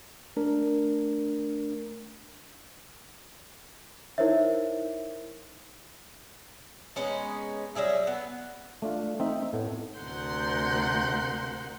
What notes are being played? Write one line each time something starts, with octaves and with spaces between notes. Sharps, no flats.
A3 D4 A#4
D#4 E4 A#4 C5 C#5 E5
G#3 B3 C#4 D#4
F#3 G3 G#4 E5
B3
A3 D4 F4
C4 D#4 E5
A2 A3 B3
D2 C3 A#4 F#5 C6 G6